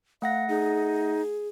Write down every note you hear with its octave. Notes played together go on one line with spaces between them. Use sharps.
A3 F5 F#5 A#6
D#4 G#4